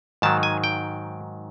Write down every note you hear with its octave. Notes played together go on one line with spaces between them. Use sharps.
G#2 D#3 F#3 A5
G#5
G5